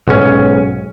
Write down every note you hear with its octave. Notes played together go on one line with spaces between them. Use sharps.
B1 G#2 C#4